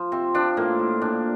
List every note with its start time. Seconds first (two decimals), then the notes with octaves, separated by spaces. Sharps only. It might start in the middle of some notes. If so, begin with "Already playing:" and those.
Already playing: F3
0.12 C3 C4
0.34 F3 D4
0.57 A2 A#3
0.79 F3
1.02 A#2 D4